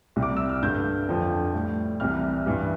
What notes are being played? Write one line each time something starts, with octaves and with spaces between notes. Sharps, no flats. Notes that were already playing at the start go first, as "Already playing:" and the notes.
C2 C3 G3
D6
E6
F6
G2 D3 G3 G6
F2 D3 F3
A2 G3
C2 C3 E3 G3 F6
G2 E3 G3